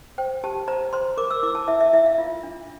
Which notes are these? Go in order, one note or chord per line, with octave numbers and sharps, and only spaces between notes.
C5 G5
G4 A5
C5 A#5
C5 C6
A#4 D6
E6
E4 D6
A5
E4 E5
E5
E4 E5
F5
F4
D4